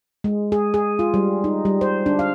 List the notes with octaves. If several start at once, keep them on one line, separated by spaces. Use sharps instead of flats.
G#3
G#4
G#4
F4
G3
D#4
G3
C5
D4
F5